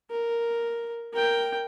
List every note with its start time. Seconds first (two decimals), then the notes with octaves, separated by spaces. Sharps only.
0.10 A#4
1.13 A#4 G5